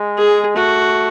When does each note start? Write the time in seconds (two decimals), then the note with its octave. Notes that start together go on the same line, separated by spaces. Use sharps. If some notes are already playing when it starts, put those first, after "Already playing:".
Already playing: G#3
0.17 G#4
0.56 A3 F#4